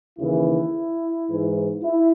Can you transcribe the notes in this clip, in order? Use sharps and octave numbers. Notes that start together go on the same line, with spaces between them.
D#2 C#3 E3 E4
G#2 E3
E4